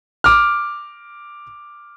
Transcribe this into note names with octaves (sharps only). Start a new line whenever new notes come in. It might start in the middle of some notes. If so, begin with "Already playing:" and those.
D6 F6